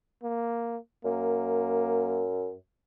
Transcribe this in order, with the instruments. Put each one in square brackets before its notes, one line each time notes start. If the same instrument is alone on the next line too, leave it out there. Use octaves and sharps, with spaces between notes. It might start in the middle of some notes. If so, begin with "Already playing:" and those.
[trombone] A#3
[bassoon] F#2 [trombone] A#3